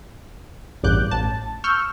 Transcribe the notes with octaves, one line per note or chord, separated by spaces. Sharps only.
A1 E2 G2 D6 F#6 G6
A1 A5
C#6 E6 F6 G6